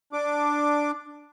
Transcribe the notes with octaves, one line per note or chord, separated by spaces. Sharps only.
D4 D6